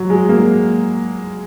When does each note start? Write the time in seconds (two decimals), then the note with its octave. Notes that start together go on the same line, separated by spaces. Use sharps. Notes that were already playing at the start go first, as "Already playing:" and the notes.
Already playing: F#3
0.10 G#3
0.29 A#3